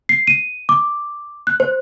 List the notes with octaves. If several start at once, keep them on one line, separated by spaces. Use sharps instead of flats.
C7
D#7
D6
F#6
C5